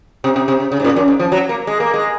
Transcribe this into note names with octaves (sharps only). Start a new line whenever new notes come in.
C3
C3
C3
C#3
C#3
G#2
A#2
F#2
G#2
F3
F#3
A#3
G#3
A#3
G#3